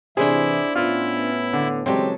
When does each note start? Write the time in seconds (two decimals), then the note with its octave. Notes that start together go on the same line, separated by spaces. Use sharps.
0.17 C3 E3 D4 E4 G#4 C5
0.75 A2 B3 C#4 E4 F4
1.53 D3
1.86 C#3 E3 F#3 G#3 C4 G4 A4 D5